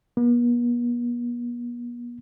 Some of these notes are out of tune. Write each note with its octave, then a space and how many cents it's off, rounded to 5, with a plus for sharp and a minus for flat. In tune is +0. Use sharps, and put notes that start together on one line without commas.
B3 -45